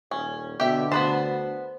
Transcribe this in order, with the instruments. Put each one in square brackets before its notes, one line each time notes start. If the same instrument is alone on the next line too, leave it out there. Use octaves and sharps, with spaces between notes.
[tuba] D#1 [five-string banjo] C#4
[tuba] B2 [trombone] D3 [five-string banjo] G4 E5
[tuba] D2 [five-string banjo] B3 B4 A5 [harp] C5